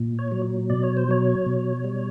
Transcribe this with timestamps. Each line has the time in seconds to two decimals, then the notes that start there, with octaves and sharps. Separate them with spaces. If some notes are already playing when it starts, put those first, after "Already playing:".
Already playing: A#2
0.19 C#5
0.32 F#3
0.70 B2 D5
0.83 C#5
0.97 C5
1.08 F#3 C#5
1.46 B2
1.84 G3